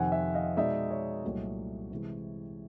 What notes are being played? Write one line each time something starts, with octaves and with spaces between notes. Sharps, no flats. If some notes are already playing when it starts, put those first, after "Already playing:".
Already playing: F2 C3 D#3 F#5 G#5
E5 F#5
D#5 F5
B2 G#3 B3 D#4 D5 E5
C#5 D#5
C2 A#2 F#3 A3
C3 E3 G#3